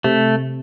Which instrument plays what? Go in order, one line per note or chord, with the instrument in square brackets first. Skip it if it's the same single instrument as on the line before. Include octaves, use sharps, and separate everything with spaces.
[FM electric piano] C3 [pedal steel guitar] A3